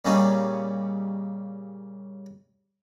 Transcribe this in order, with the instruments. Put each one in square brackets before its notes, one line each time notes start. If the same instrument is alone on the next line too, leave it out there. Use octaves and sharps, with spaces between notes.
[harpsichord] A#2 C#3 G3 C#4 D#4